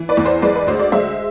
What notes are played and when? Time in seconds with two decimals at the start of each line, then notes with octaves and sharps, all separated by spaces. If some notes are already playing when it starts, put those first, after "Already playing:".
Already playing: E3
0.09 B4 D5
0.17 E2
0.25 C5
0.42 G#3 B4 D5
0.55 B4
0.67 D2 C5
0.79 D5
0.92 G#3 C5 E5